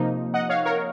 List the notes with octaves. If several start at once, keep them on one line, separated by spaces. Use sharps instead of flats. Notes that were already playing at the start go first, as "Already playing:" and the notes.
Already playing: C3 F3 A#3 D#4
D#5 F#5
C#5 F5
A#4 C#5